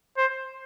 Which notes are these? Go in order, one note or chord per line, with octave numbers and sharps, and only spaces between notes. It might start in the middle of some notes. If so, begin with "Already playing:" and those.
C5